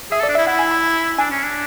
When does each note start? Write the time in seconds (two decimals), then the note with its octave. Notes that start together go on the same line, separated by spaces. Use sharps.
0.11 G#4 E5
0.20 A4 D5
0.29 D4
0.35 E4 E5
0.47 E4 F#5
0.59 G#5
0.71 B5
1.18 D4 G#5
1.31 C#4
1.43 D4